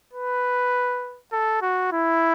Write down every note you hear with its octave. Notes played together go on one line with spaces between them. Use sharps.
B4
A4
F#4
E4